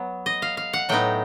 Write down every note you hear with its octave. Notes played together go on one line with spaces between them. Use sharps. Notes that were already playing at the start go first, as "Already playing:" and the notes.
Already playing: F#3 B3
D#5
F5
F5
F#5
A2 F#3 B3 D#4 G5